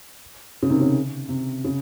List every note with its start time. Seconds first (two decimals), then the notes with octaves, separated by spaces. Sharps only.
0.62 C#3
0.69 C3 D#3
0.81 C#3
1.29 C3
1.64 C#3